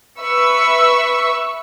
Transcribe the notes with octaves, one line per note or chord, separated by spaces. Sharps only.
B4 E5 C#6 E6